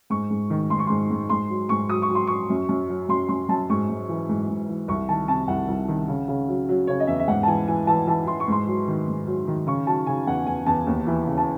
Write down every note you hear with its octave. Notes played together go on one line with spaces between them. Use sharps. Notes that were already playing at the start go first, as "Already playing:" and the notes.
G#2 C#6
G#2
D#3
G#2 C6
C#6
G#2 C6
G#2
G#2 C6
F#3
G#2 C#6
F#3 D#6
C#6
F#3
C6
F#3 C#6
F#2
F#2
F#3
F#2 C6
F#2 C6
F#2 A5
G#2 C#6
G#2
E3
G#2
G#2
E3
C2 C#6
D#3 A5
C3 A5
C2 F#5
C2
D#3
C#3
C#3
F#3
F#3
C#3 C#5
D#5
E2 E5
E5
G#2 F#5
A5
E3 G#5
E3 G#5
E3 A5
E3 A5
E3 C6
C#6
G#2 C6
F#3
D#3
G#2
F#3
D#3
C#3 C#6
F#3 A5
C#3 G#5
E2 F#5
E2 G#5
E2 A5
D#2
E3
C#3
A5